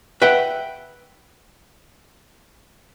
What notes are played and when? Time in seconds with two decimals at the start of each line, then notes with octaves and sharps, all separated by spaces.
0.22 B4 E5 F#5 G5